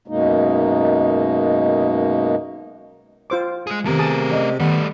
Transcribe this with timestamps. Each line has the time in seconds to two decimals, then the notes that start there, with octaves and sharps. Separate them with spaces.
0.08 F#2 B2 G#3 A#3 D#4
3.30 F4 C5 D6
3.67 G#3 G#4
3.85 C3 D#3 A3 B3 A#4 G#5
3.99 G#4 A5 D#6
4.29 C#4 D5 D#5
4.60 D#3 G3 A3 B3